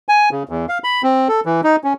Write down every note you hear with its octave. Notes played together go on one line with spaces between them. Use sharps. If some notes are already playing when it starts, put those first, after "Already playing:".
G#5
C#3
E2
F5
B5
C4
A4
E3
D#4
C#4